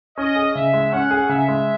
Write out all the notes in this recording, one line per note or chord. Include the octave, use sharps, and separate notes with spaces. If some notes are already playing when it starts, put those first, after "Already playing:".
C#4 D#5
G#4
C#3 E5
G#3
C#4 F#5
G#4
C#3 E5
G#3